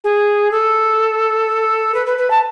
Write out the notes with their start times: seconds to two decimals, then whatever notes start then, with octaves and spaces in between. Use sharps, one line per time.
0.04 G#4
0.51 A4
1.94 B4
2.06 B4
2.18 B4
2.30 A5